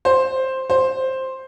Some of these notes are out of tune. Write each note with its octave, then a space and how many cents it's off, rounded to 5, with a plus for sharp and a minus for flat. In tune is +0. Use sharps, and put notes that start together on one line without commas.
C5 +5
C5 +5